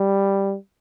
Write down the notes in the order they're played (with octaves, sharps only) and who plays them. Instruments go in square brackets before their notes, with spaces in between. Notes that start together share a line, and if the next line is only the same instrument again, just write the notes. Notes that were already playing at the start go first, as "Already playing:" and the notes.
Already playing: [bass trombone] G3